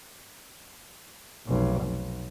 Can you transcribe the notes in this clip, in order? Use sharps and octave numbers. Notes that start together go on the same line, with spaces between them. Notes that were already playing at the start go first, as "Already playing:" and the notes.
F1 B1
B1